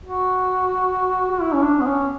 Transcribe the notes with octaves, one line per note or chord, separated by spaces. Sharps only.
F#4
F#4
E4
C#4
D4
B3
C#4